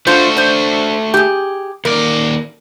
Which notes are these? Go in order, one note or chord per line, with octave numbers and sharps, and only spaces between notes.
A3 D4 F4 F#4 C5
D4 C5
G4 G#4
D#2 A#4 D5